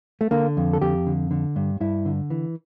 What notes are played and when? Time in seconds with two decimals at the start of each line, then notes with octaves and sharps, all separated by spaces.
0.21 A3
0.31 D3 A#3
0.57 F2
0.73 A4
0.81 F2 G4
1.07 D3
1.31 D3
1.56 G2
1.80 G2 E4
2.05 D3
2.30 E3